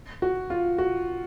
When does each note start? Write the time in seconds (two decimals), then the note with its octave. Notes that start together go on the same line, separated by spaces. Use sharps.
0.22 F#4
0.50 F4
0.78 F#4